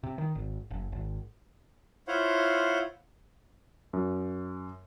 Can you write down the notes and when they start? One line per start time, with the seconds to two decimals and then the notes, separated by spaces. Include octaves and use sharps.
0.03 C3
0.18 D#3
0.35 G#1
0.71 F#1
0.92 G#1
2.08 E4 F4 C5 C#5 F5 F#5
3.93 F#2